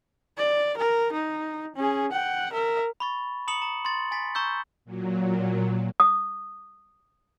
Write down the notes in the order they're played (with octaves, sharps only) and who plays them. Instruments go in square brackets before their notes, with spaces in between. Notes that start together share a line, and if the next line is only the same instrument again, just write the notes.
[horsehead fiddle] D5
A#4
D#4
C#4 G#4
F#5 G5
A#4 E5
[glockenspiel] B5 C#6 A6
A#5 B5 D#6 C#7 F#7
A#5
C6 A6
G#5 A6 B6
A#5 C#6 E6 G6
[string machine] A#2 F#3
[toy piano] D#6